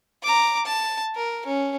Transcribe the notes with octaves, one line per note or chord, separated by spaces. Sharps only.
A#5 D6
A5
A#4
C#4